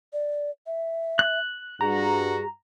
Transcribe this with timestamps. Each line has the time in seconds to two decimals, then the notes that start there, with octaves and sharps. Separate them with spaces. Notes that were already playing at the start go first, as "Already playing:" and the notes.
0.13 D5
0.67 E5
1.19 F#6
1.81 G2 F#4 G#4 A#5